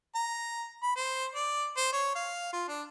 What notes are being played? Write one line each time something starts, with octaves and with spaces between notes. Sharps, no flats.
A#5
B5
C5
D5
C5
C#5
F5
F4
D4